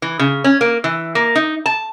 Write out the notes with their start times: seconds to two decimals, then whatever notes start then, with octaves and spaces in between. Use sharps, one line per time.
0.02 E3
0.19 C#3
0.44 C#4
0.61 A#3
0.84 E3
1.15 A#3
1.35 D#4
1.66 A5